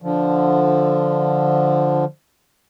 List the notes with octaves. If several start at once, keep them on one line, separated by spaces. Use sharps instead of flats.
D3 F3